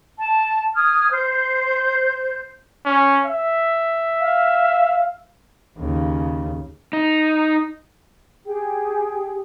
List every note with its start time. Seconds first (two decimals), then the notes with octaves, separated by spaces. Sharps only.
0.19 A5
0.76 D#6 F6 G#6
1.11 C5 G6
2.86 C#4
3.26 E5
4.21 F5
5.79 D#2 C#3
6.93 D#4
8.45 G4 G#4 G5